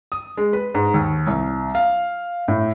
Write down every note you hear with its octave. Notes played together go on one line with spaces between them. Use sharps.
D#6
G#3
B4
G#2
D#2
C2
F5
A2